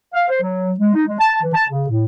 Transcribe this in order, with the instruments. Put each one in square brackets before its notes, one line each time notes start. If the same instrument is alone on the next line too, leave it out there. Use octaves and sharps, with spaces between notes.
[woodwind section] F5
C5
F#3
G#3
D#4
G#3
A5
E3
A5
C#3
A2